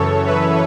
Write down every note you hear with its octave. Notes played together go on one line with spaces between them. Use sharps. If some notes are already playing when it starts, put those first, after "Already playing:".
Already playing: F#2 C#3 E3 A4 C#5
B4 E5